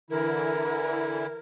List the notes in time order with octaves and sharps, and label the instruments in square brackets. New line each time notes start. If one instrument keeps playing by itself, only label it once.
[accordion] D3 E3 E4 [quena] A#4